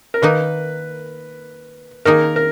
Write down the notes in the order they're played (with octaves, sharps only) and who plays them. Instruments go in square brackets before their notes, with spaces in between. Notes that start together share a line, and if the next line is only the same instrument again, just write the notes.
[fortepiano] A#4
[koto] D#3 A#3 D#4 [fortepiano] B4
[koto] D#3 A#3 D#4 G#4 [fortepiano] A#4
[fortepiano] A#4